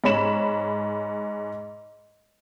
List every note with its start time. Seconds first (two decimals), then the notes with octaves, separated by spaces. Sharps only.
0.04 G#2 C#5 B5 E7 F#7